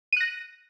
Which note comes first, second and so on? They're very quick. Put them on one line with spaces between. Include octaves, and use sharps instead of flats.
D#7 F#6 A#6